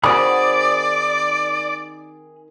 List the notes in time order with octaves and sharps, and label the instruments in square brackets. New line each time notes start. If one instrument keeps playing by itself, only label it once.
[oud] D#3 C4 F#4 [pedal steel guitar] G#4 B5 D#6 [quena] D5